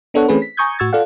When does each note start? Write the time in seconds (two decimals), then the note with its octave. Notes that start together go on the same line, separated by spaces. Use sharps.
0.14 B3 D4 A4 C#5 F#5
0.28 E3 A3 C4 C#4 G#4 B4
0.42 B6
0.57 G#5 A#5 C#6 D#6 G6 G#6
0.79 A2 F#4 C#6 E6 G#6 A6
0.93 F4 A4 D5 F5 F#5